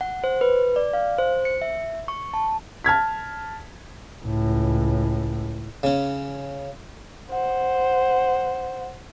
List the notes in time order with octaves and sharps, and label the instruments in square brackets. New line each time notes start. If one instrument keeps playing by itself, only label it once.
[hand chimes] F#5
C5
B4
D5
F5
C5
C#7
E5
C#6
A5
[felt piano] A5 F6 G#6 B6
[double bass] C#2 A2
[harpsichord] C#3 C#4
[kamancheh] C5 F#5